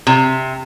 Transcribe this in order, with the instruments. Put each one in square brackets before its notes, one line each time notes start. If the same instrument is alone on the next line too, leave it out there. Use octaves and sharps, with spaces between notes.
[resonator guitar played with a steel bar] C3